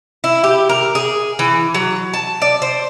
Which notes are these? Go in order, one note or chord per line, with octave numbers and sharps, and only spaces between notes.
E4
G4
A#4
G#4
E3
F#3
A5
D5
C5